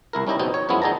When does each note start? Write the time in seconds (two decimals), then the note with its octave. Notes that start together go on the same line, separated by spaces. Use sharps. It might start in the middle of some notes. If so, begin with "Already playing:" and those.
0.13 C2 E4 A#4
0.27 G3 C#4 D#4 E4 G4 D#5
0.39 A#1 E2 B2 C4 D#4
0.54 C#5
0.69 F#2 F3 G#3 B3 E4
0.82 D#3 D#4 G#4 D5 A5 A#5